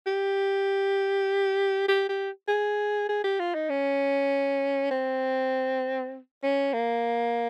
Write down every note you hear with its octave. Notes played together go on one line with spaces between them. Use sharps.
G4
G4
G4
G#4
G#4
G4
F4
D#4
C#4
C4
C#4
A#3